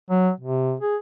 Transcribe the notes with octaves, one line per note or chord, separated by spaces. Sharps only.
F#3
C3
G#4